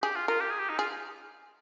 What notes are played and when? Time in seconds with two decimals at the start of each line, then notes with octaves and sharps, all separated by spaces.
0.03 G4 G#4
0.15 F4
0.28 F4 A#4
0.40 G4
0.50 G#4
0.59 G4
0.70 D#4
0.79 F4 G#4